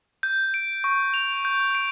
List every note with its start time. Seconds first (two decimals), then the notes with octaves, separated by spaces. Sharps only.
0.23 G6
0.54 D7
0.84 C#6
1.14 F7
1.45 G6
1.75 D7